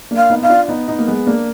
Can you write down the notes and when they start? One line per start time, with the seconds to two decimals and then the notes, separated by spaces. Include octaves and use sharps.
0.11 A#3 D4
0.17 F5
0.30 B3 D#4
0.42 D#4 F5
0.49 D4 F4
0.68 B3 D#4
0.88 B3 D#4
0.99 A#3
1.08 G#3 B3
1.26 A#3 D4